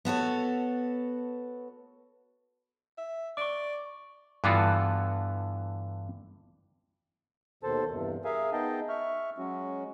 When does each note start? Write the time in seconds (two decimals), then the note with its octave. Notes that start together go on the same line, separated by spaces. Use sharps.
0.05 B3 F#4 A4 C#5
2.98 E5
3.37 D5 C#6 D6
4.44 G2 D3 E3 B3 F4 F#4
7.63 D#2 B2 D#3 A4 C5 A5
7.91 E2 G2 C3
8.24 G#4 A#4 E5 F5 G#5
8.53 B3 D#4 G#4 D#5 G5 A5
8.89 E5 C#6 F6
9.38 F#3 G#3 C#4 F#4